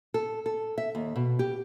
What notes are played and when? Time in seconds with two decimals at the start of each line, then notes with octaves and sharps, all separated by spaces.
0.14 A4
0.46 A4
0.78 E5
0.95 D#2
1.16 B2
1.39 G4